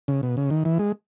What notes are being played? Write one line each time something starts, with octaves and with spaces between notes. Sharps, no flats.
C#3
B2
C#3
D#3
E3
G#3